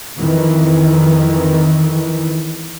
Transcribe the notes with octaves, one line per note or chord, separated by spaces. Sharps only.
F2 D#3 E3